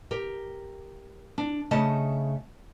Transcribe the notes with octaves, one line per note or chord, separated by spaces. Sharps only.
G4 A#4
D4
C#3 A3 D#5 A5